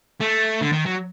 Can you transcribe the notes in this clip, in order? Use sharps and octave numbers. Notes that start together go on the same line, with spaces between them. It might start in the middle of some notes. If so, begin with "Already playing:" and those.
A3
D3
D#3
F#3